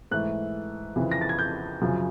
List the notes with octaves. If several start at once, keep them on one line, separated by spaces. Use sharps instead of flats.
G#2 E3 A3 F#6
F2 C#3 E3
A#6
A6
G#6
G6
F#2 C#3 F3